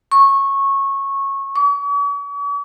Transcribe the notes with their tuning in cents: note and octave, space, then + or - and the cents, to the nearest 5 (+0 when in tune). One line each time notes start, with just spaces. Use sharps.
C#6 -15
C#6 +45